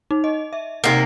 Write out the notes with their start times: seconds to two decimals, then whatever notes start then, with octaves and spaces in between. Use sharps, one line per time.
0.11 D#4
0.24 D#5
0.53 E5
0.84 C3 A#3 D#4 F#5